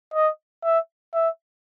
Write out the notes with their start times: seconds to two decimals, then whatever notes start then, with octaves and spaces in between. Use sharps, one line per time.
0.14 D#5
0.64 E5
1.14 E5